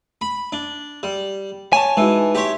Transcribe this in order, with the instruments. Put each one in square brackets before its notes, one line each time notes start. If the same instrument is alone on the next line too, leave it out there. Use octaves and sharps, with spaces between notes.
[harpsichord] B5
D4
G3
[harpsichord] C#5 [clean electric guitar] G#5 A5
[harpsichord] E3 [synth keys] G#3 D#4 F#4
[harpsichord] G4 C#5 [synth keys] E5 C6 B6